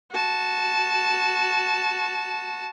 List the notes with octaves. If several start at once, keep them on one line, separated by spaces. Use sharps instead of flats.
F#4 A5